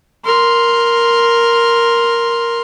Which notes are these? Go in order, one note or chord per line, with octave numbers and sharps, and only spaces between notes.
A#4 C6